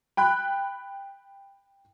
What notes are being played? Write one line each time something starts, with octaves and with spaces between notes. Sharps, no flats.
G5 B5 F#6